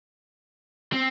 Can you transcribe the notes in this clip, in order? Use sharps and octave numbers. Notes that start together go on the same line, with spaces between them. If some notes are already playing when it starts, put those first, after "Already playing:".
C4